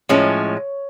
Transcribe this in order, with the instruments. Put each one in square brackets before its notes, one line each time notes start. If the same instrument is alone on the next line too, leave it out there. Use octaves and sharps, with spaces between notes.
[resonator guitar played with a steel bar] A2 F3 G#3 C#4 [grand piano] C#5